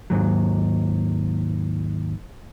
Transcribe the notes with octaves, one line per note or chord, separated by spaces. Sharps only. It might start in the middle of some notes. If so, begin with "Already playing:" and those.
D#2 G#2 F#3